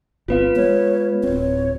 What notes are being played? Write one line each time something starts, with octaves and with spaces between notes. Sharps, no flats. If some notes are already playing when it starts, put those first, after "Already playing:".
G1 B3 C4 F4 B4 F5
G#3 B3 C#5
D1 C4 C#5